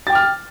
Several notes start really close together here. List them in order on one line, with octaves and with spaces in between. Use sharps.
A6 G5 D6 F6